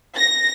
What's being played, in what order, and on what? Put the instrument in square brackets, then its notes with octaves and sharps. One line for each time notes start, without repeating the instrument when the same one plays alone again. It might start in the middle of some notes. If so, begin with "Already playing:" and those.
[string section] A#6